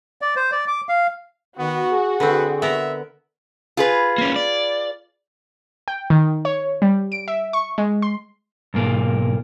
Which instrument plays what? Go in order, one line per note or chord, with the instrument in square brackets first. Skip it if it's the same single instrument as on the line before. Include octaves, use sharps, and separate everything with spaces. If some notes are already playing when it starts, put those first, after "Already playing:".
[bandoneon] D5
C5
D5
D6
F5
[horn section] D#3 [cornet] B3 [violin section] F#4
[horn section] G#4
[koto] D3 C4 [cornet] B4
[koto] B3 A#4 [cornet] E5
[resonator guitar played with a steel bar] F4 G#4 B4
[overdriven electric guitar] A#3 C#4
D5
[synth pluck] G5
D#3
C#5
G3
D7
E5
C#6
G#3
C6
[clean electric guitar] B1 G#2 A#3